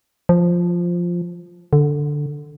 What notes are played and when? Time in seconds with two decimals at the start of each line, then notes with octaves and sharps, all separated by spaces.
0.29 F3
1.73 D3